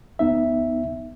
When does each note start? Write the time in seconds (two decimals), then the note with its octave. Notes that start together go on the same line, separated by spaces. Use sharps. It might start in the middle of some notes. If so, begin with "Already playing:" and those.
0.19 D2 B3 D#4 E5